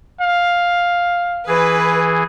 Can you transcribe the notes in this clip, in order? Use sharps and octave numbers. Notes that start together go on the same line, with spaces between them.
F5
E3 G#4 B4